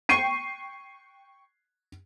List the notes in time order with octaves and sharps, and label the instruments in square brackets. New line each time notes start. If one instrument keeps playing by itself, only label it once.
[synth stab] G5 C#6 [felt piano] C7 D#7